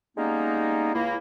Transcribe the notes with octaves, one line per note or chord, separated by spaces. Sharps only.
G3 G#3 A#3 B3 C#4 D#4
C#2 A#3 E4